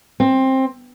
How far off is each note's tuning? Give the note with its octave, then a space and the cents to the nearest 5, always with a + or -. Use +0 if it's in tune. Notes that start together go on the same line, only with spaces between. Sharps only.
C4 +15